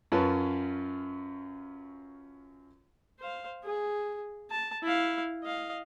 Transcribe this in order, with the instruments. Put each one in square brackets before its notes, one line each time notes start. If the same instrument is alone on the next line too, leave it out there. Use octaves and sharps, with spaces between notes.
[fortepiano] F#2 C#4 F4 B4 A5
[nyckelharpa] C5 F5
G#4
A5
E4 F5
D#5 F5